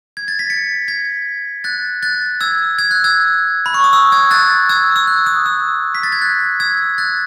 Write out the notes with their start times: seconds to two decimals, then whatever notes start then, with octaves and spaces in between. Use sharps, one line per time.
0.17 G#6
0.28 A6
0.39 B6
0.50 A6 C#7
0.88 G#6 B6
1.64 F#6 A6
2.03 F#6 A6
2.41 E6 G#6
2.78 E6 G#6
2.91 F#6
3.04 E6 G#6
3.66 B5
3.74 C#6
3.84 D#6
3.93 E6
4.12 E6 G#6
4.31 F#6 A6
4.69 E6 G#6
4.96 E6
5.07 F#6
5.26 D#6
5.46 E6
5.95 B6
6.03 A6
6.12 G#6
6.22 F#6
6.60 E6 G#6
6.98 F#6 A6